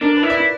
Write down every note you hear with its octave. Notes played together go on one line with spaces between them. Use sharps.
D4 A#4
B4
E4
D5
E4